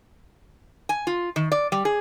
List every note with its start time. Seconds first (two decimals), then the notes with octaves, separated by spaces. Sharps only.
0.89 G#5
1.07 F4
1.36 D#3
1.52 D5
1.72 G3
1.85 G#4